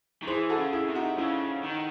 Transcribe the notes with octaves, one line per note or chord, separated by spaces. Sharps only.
D#3
E3 G#4 C5
F#4 A4
C#3
E4 G#4
C3
D#4 F#4
C#3 E4
D#3